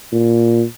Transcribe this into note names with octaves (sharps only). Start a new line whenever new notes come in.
A#2